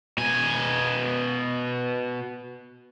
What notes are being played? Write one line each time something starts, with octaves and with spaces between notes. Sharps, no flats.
B2 G#5